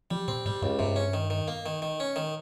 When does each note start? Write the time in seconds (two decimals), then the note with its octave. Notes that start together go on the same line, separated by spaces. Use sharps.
0.11 F3 G3
0.28 A#2 C4
0.45 G#2 G3
0.62 C#2 G2
0.79 G2 C3
0.96 C#4
1.14 D#3
1.30 D#3
1.48 A#3
1.66 D#3
1.82 D#3
2.00 C#4
2.16 D#3